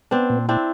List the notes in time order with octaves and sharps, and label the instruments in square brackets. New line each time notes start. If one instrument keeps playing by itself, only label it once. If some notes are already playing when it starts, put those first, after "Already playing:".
[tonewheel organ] B3 [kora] C4 D4
[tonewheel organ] A#2
[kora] C4 D4 [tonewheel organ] E4